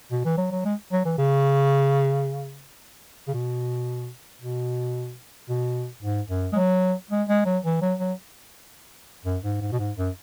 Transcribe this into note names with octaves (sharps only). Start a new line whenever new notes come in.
B2
E3
F#3
F#3
G#3
F#3
E3
C#3
C#3
B2
B2
B2
G#2
F#2
G#3
F#3
G#3
G#3
F#3
E3
F#3
F#3
F#2
G#2
G#2
B2
G#2
F#2